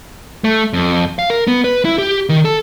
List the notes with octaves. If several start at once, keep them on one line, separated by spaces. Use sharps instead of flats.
A3
F2
F5
A#4
B3
B4
E4
G4
D#3
A4